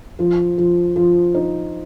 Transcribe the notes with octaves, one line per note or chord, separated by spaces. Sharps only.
F3
F3
F3
D#4